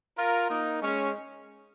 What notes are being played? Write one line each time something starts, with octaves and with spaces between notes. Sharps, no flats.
F4 A#4
A#3 D#4
G#3 C#4